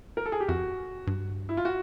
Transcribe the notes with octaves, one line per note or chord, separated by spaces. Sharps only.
A#4
A4
G#4
G4
F2 F#4
G2
E4
F4
F#4